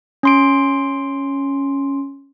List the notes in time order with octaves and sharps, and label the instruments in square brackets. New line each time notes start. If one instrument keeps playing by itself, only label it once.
[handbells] C#4 C6 D7